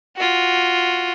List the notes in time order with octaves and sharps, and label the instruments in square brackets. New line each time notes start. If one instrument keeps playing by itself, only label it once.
[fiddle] F4 F#4